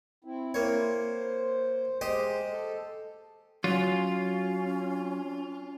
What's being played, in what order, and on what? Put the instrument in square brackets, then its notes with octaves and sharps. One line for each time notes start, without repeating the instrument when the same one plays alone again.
[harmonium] C4 E4
[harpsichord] A#3 C#5 [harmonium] C4 E4
[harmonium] C5
[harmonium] G#3 [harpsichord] G4 C5 D#5
[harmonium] A4
[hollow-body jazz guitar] F#3 [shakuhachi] C#4 [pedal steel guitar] F4